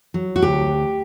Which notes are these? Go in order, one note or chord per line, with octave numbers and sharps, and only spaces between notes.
F#3
F#4
D2 G4